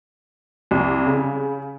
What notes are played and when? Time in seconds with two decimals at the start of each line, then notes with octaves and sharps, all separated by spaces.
0.71 C2
1.06 C#3